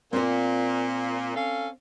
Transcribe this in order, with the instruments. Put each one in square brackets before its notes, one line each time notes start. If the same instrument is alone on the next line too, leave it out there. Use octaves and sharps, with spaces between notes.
[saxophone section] A#2 [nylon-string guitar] C4 C5
[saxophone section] C#4 A4 F5